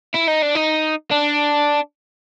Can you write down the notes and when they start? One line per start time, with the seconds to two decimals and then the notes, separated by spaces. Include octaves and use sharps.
0.14 E4
0.27 D#4
0.42 D4
0.55 D#4
1.11 D4